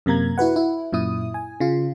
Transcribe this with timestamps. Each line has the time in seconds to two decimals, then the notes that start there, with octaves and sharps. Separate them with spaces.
0.06 F#2 C3 A#3 A#5 G#6
0.38 E4 F#4 B4 F#5
0.56 E4
0.93 F#2 A#2 E4 D#6
1.34 G#5
1.60 C#3 F4